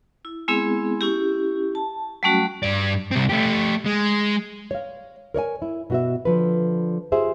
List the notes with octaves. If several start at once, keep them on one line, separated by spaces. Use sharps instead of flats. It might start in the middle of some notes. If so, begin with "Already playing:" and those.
E4
G#3 B3 C4 E4 G#4
C#4 E4 G4
A5
F#3 G3 A3 C#4 F#4
G2 D5
C2 C4
A3 G4
G#3
C#5 F5
A#4 C#5 D5 G#5
E4
B2 F#4 E5
D3 F3 B4
F4 G4 G#4 C5 E5